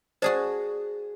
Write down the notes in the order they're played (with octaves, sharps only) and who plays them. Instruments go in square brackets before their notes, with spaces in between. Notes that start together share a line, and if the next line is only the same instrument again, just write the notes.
[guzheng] F#4 G#4 A5 [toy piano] C5 D5